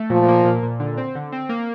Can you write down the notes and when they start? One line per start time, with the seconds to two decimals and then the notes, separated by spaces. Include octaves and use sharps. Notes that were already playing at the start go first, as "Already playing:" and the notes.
Already playing: A3
0.10 A#2 F3
0.28 A#3
0.45 A#2
0.63 A#2
0.80 D3
0.97 C4
1.15 D3
1.32 C4
1.49 A#3